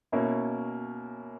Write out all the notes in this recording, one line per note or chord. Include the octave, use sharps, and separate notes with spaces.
B2 A#3 C#4 E4